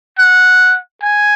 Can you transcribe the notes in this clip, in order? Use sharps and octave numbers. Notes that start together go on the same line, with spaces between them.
F#5
G#5